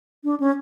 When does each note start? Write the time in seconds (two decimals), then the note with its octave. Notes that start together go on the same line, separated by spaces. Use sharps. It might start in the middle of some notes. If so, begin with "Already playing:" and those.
0.24 D4
0.40 C#4